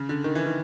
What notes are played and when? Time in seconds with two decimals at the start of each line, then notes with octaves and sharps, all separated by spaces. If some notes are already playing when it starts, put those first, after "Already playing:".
Already playing: C#3
0.09 D3
0.24 D#3
0.35 E3
0.46 D#3